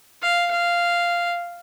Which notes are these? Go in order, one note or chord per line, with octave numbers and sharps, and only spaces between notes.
F5
F5